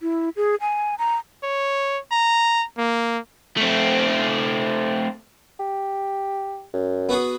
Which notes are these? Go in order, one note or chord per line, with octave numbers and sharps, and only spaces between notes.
E4
G#4
G#5
A#5
C#5
A#5
A#3
A3 C4
G4
F#2
B3 F#4 G#4